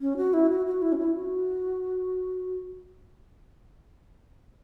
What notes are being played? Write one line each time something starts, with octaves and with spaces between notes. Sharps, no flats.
C#4
F#4
E4
F#4
F#4
E4
C#4
E4
F#4